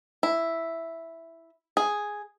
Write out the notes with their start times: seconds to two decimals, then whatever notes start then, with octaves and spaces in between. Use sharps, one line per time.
0.23 E4
1.77 G#4